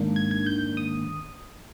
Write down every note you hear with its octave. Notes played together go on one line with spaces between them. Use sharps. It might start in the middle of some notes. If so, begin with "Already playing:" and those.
Already playing: G#2 D#3 A#3 D4
G#6
G#6
G6
D#6